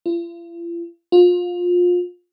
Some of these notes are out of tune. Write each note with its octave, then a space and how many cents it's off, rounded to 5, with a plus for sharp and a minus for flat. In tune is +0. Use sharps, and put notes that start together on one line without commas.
F4 -45
F4 +25